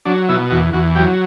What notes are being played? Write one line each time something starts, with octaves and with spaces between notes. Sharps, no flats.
F#3 D4
B2 E4
E2 F#4
E2 F#4
F#3 G4